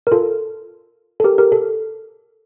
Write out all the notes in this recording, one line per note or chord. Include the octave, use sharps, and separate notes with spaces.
A#4
F4 A4
A4
G4 A#4
G4 A#4
A4